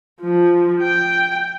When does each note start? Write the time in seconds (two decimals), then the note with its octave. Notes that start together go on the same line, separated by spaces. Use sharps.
0.21 F3
0.82 G5